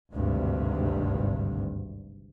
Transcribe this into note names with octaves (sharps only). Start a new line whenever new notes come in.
G#1 D2 G2 C3